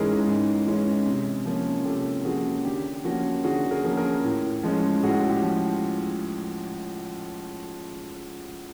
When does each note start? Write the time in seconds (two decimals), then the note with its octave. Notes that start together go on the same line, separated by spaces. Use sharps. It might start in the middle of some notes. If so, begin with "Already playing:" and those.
Already playing: G#2 E3 G#3 C#4 G#4 A#4
0.26 G#2
0.66 E3 G#3 C#4
1.06 C3
1.46 F3 A#3 C#4
1.85 C3 G4 A4
2.24 F3 A#3 C#4 F#4 G#4
2.65 D3 G4
3.05 F3 A#3 C#4 F#4
3.44 D3 F#4 G#4
3.71 G#4 A#4
3.84 F3 A#3 C#4
3.97 G#4 A#4
4.24 A2
4.63 F3 G#3 C#4
5.03 A2 F#4 G#4
5.30 G4
5.42 F3